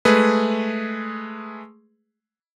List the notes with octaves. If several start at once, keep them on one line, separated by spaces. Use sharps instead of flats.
G#3 A3 G#4 B4